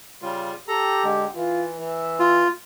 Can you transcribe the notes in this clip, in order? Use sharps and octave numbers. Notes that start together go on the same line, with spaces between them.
C#3 G3 F4
G4 A4 A#5
D3 G#3
E3 F4
E3 E5
F4